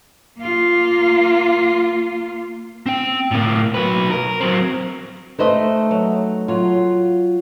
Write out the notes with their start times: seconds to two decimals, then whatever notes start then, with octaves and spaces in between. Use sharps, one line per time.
0.38 A#3 F4
2.86 C4 G5
3.31 A2 A#3
3.74 F#3 B4
4.11 A#4
4.40 F#3 C4
5.39 A3 D#4 B4 C5 D#5
5.91 F#3
6.48 F#3 F4